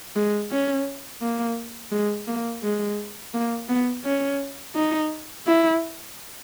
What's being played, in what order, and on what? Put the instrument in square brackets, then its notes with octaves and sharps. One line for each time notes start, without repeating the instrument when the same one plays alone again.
[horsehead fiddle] G#3
C#4
A#3
G#3
A#3
G#3
A#3
B3
C#4
D#4
E4